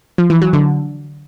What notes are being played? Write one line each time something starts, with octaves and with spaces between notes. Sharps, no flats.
F3
E3
F#3
D3